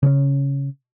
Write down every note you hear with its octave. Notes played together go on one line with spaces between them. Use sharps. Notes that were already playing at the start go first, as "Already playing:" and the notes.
C#3 C4 C#4